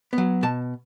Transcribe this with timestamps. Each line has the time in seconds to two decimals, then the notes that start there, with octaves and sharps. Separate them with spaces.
0.13 B3
0.18 F#3
0.43 B2 A5